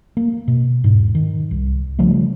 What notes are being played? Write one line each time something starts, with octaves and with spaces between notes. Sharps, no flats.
A#3
B2
E1 G#2
D#3
C2
C#3 F3 G3 A3